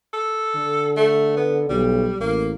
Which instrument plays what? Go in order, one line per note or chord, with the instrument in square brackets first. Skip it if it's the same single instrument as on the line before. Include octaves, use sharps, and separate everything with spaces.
[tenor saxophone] A4
[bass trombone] D3
[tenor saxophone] A3
B3
[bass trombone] B1 [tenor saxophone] G3
[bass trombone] A1 [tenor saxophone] A#3